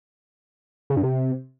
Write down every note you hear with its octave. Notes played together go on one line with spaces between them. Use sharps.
C#3
G2
C3